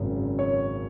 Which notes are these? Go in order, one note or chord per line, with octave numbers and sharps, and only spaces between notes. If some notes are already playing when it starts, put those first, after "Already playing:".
Already playing: G#1 F#2 C#3
C#5